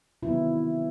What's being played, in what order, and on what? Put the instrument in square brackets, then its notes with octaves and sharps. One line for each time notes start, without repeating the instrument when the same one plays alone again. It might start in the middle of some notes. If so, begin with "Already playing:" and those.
[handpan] C3 D#3 F#3 B3 E4